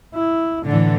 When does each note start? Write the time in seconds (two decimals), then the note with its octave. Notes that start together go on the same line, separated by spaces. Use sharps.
0.15 E4
0.67 A2 D3 E3